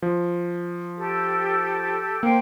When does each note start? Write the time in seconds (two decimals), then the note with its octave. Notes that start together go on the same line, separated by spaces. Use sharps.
0.02 F3
0.98 G4 A4
2.23 A#3 C5 G5